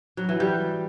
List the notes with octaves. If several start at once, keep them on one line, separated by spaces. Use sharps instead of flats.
F#3
E3
G3